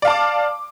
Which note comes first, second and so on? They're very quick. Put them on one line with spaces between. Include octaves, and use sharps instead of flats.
D5 F5 A5 D6